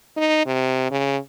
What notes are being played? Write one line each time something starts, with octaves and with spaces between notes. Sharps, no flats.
D#4
C3
C#3